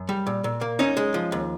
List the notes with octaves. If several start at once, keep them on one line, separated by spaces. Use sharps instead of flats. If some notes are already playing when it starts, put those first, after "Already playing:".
Already playing: F#2
G3
A#2
A#2
A#3
F#2 C#4 D#4
G#3
F3
D#2